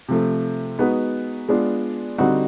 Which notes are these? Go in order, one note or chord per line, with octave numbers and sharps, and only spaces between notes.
C3 F3 A3
G#3 B3 D#4 F#4 B4
G#3 B3 D4 F4
D3 G3 C4 D#4 F#4